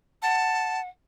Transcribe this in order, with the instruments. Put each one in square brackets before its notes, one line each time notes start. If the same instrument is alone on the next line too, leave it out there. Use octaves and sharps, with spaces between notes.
[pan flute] F#5 [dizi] A5